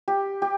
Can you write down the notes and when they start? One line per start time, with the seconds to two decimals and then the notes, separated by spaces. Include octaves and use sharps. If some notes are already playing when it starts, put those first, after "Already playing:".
0.08 G4
0.42 G4